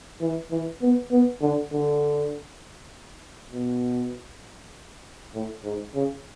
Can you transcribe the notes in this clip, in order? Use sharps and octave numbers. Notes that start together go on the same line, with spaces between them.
E3
E3
B3
B3
D3
D3
B2
A2
G#2
C#3